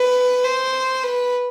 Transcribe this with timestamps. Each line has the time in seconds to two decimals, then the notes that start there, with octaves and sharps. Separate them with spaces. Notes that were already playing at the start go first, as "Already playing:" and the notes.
Already playing: B4
0.44 C5
1.03 B4